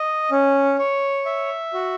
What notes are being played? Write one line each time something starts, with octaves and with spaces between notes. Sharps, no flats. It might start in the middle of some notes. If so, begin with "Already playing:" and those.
Already playing: D#5
C#4
C#5
E5
F#4